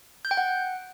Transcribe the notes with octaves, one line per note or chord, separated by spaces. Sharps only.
G6
G5
F#5